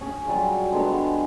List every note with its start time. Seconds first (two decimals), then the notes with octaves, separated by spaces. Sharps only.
0.01 C#4 G#4
0.26 F#3 G3 F4
0.71 D3 G#3 B3